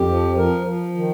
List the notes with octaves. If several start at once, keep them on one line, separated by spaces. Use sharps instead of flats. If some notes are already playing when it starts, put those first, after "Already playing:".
Already playing: F2 G4
F3
F3 A#4
F3
D#3